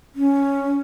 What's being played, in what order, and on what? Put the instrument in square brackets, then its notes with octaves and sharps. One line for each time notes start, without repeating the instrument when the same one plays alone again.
[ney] C#4